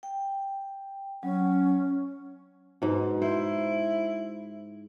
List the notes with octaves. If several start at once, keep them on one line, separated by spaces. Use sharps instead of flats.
G5
F#3 C#4
G#2 B2
E4 C5